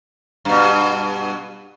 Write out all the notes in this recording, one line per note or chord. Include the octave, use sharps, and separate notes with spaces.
G2 B2